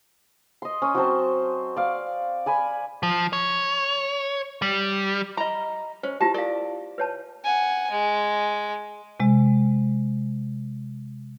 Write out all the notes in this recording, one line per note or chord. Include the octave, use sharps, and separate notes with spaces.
D#5 C6
C#4
F#3 C4 C5 A5
D5 F5
D5 G#5 B5
F3
C#5
G3
D#5 A#5 B5
C#4 C5
E4 F4 G4 A5
A#4 D5 F5
B4 C#5 A5
F#5 G#5
G#3
C3 G#3